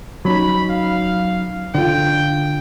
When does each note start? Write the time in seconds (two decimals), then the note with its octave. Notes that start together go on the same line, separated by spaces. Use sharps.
0.25 F#3 C#4 D#4 B5
0.70 F5
1.75 D3 F4 G5